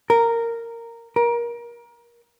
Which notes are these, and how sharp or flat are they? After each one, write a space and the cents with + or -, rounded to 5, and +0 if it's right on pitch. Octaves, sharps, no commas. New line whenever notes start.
A#4 -10
A#4 +25